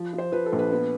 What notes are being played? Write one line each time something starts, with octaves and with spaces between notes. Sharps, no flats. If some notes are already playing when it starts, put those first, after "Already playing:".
Already playing: F3
F3
C5
F3 B4
A4
A#1
B4
B3